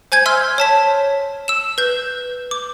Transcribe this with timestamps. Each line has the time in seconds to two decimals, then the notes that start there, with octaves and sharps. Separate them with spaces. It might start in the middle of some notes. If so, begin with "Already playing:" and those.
0.12 C5 G#5 G6 G#6
0.26 E5 C6 E6 F6
0.58 C#5 A5 B6
1.48 E6 E7
1.78 B4 G6
2.51 D6